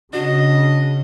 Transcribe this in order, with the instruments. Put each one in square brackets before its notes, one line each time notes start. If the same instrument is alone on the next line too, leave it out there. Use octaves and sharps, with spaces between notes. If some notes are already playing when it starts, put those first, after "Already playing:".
[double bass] C#3 [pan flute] D4 [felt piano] F#4 [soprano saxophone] D#5